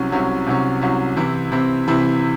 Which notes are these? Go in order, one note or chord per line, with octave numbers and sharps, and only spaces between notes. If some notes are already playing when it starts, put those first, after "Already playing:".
Already playing: C2 C3 F#3 C#4
C2 C3 F#3 C#4
C2 C3 F#3 C#4
C2 C3 F#3 C#4
C3 E3 C4 E4
C3 E3 C4 E4
C3 E3 C4 E4